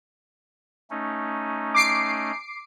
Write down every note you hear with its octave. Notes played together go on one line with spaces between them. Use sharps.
A3 C#4 D#4
D6 C7 D7